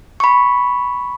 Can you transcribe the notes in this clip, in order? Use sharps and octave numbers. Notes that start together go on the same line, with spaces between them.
B5 C#6